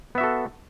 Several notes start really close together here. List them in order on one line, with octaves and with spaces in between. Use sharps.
B3 E5 F#4 A4